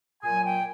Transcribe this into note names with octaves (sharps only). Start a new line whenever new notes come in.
A#2 F#3 G#5
G5